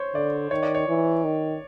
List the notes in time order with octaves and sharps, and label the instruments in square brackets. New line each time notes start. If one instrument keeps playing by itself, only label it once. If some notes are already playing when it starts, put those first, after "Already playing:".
Already playing: [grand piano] C5 C#5
[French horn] D3 [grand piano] D5
[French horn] D#3 [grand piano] C#5
[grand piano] D5
C#5
[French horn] E3
D#3